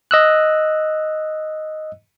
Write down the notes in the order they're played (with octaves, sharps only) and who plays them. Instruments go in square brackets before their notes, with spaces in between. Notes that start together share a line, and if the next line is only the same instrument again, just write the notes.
[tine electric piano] D#5 E6 F#6